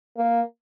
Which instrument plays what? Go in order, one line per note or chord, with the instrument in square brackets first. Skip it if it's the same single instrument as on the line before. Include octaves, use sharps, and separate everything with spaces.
[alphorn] A#3